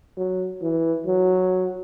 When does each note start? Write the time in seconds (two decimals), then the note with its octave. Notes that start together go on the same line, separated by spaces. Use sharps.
0.17 F#3
0.62 E3
1.07 F#3